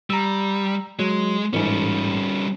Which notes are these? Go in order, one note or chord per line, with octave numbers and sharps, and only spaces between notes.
G3 A#5 E6
F#3 G#3
A1 G#2 G3 C#4